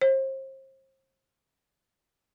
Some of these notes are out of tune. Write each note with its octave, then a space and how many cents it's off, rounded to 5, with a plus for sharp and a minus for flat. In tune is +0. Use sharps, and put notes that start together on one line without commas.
C5 +35